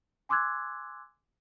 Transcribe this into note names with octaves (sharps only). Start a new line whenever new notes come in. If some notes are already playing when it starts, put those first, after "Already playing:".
G#5 C6 D6 E6 F#6 G#6